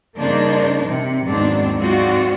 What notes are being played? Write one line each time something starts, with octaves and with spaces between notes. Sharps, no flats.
G2 C#3 A#3 D4 D#4 C5
C3
D#2 G#2 F#3 B3 C4 D4
G#2 F#3 C4 F4 F#4 D5